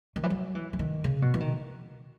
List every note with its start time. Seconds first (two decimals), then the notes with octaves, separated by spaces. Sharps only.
0.16 D#3
0.23 E3
0.30 F#3
0.55 E3
0.73 E3
0.79 D#3
1.04 C#3
1.22 B2
1.34 E3
1.40 D#3